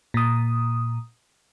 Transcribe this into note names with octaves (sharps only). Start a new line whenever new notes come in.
A#2 D#6